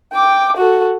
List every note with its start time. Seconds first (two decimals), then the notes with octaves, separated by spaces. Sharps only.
0.13 G5 D6
0.57 F#4 A4